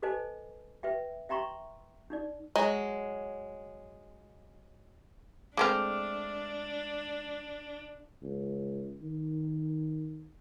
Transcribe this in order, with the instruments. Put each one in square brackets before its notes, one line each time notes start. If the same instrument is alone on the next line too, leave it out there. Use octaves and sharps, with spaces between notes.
[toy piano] A4 B4 C5 D#5 G#5 A5
B4 E5 G5
E5 G5 A#5 C6 C#6
D4 D#4 D5
[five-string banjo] F#3 G#3
[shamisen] G#3 A3 C4 [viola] D4 [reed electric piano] D6 F6
[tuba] C#2
D#3